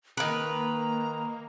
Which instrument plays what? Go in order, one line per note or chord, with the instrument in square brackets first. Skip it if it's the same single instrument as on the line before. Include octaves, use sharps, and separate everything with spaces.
[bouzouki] D#3 B4 [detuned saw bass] A#3 [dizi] A#5